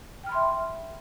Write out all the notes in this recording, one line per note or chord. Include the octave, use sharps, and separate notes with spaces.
E5 G5 B5 C6 F6